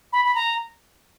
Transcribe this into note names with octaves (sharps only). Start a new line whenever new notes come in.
B5
B5
A#5